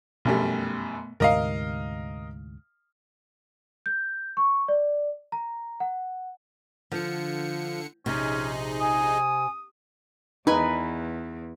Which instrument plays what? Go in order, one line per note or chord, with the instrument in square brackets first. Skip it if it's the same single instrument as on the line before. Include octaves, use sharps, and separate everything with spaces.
[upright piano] F1 F#2 G3 [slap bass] B2 A3
[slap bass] D2 G#2 C3 [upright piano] A#4 D#5 F5
[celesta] G6
C#6
D5
A#5
F#5
[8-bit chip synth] D3 C#7 [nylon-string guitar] F3
[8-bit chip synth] A#1 D#4 G#4 [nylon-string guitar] C3 [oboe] C#4
[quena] G#5 [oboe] D#6
[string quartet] E2 [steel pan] D#4 [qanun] B4 G#5